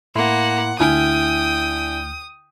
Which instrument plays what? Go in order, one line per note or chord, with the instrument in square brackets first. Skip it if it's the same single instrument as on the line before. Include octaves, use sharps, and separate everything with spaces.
[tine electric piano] A2 E4 C6 [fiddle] A#3 [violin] F#5
[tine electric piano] D2 F6 [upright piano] D3 E4 G#5 [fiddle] G5 [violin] D#6